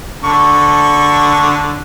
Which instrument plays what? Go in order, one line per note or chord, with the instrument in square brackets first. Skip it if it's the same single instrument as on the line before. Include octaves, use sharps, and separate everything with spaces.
[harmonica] D3 A4 C#6